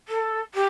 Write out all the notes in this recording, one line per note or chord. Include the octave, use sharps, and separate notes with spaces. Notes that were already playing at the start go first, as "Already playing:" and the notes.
A4
G4